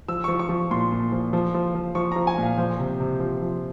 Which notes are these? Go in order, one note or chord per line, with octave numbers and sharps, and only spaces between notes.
F3 E6
F3 C#6
C#6
F3
A#2 C6
A#2
F3
F3
F3
F3
F3 C#6
F3 A#5
G#5
A#2
F5
F3 C5
C3
C3
F3
F3